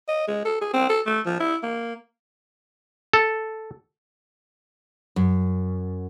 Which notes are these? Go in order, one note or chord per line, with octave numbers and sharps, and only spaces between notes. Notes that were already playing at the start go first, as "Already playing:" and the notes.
D#5
G#3
A4
G#4
C4
A4
A3
F3
E4
A#3
A4
F#2